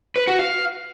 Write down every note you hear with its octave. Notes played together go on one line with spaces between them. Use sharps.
B4
F#4
F5